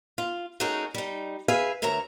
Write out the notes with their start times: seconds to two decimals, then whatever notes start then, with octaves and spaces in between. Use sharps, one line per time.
0.18 F4
0.60 A3 C#4 D#4 F#4 G#4 A#4
0.94 G3 D#4
1.48 G#4 B4 E5 F5 G#5
1.82 D2 A#4 C#5 E5 A#5